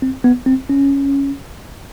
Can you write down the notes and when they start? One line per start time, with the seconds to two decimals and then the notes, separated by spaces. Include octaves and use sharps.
0.02 C4
0.24 B3
0.46 C4
0.69 C#4